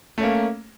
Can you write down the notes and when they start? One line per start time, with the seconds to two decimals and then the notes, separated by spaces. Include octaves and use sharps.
0.18 A3
0.20 C#4
0.23 A#3